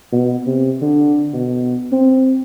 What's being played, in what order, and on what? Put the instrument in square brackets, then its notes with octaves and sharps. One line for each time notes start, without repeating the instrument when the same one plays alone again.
[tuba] B2
C3
D3
B2
C4